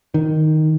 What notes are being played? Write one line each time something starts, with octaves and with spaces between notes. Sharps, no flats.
D#3